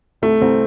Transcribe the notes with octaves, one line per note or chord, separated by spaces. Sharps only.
C2 A3
C2 C4